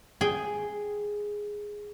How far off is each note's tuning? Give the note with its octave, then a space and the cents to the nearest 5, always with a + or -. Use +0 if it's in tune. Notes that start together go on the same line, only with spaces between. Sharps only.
G#4 +0 G5 +0